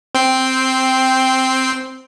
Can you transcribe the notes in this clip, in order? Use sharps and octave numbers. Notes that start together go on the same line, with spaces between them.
C4 G5 C7